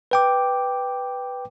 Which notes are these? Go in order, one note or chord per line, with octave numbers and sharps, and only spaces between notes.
B4 G5 D6